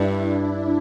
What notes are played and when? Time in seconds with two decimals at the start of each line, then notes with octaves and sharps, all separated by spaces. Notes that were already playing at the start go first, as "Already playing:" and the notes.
Already playing: G2 D4 E4